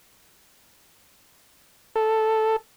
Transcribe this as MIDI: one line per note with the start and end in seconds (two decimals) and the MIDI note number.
1.96 2.56 69